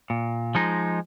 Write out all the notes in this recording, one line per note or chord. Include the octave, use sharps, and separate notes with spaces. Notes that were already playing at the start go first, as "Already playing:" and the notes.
A#2
F3 G#3 D#4